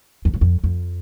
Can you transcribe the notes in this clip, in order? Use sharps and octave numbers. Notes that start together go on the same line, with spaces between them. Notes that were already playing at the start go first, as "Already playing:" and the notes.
F2
F#2
F2
F2